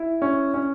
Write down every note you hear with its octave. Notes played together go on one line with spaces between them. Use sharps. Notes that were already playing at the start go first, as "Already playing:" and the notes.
Already playing: E4
C#4
C#4